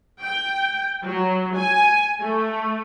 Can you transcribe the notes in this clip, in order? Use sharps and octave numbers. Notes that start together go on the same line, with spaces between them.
G5
F#3
G#5
A3